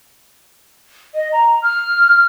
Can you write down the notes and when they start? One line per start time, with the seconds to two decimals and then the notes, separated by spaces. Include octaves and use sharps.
1.15 D#5
1.33 A#5
1.63 F6